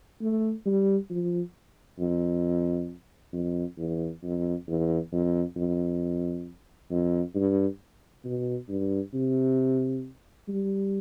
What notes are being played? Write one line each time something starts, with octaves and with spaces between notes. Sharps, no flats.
A3
G3
F3
F2
F2
E2
F2
E2
F2
F2
F2
G2
B2
G2
C3
G3